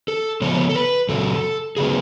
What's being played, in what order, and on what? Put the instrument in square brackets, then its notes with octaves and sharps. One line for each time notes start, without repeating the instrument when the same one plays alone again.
[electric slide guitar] A4
C#3 F3 B3 C#5
A4
B4
F#2 C#3 F#3 A4
C#3 F#3 B3 G#4